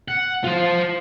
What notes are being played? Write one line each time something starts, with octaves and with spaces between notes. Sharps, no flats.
F#5
F4 C5